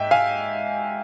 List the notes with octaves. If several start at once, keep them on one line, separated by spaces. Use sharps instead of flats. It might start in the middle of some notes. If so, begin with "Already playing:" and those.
Already playing: G#2 E5 G5
F5 G#5